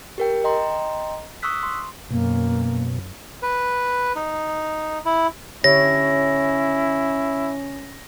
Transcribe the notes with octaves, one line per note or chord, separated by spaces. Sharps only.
G4 A#4 G5
D#5 G5 A#5 C6
C#6 D#6 E6 F#6 B6
C6
F#2 B2 A#3
B4
D#4
E4
D3 C#4 E4 G4 C#5 A#6